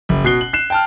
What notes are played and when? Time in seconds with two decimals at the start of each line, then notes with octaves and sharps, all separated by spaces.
0.09 F#1
0.24 B2 F#6 C7 G7
0.41 F#7
0.53 F#6 C7 E7
0.70 G5 A5 F6